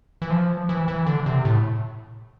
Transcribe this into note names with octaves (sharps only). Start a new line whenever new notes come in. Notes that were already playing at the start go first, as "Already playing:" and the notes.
E3
F3
E3
E3
D3
C3
A2